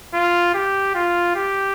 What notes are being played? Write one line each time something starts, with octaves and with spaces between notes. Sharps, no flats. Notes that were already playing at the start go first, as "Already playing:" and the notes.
F4
G4
F4
G4